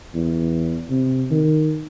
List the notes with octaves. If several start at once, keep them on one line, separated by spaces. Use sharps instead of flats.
E2
C3
D#3